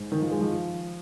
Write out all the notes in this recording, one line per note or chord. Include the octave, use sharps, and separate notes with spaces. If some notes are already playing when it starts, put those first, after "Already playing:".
Already playing: G#2
D#3
F3
G#3
F3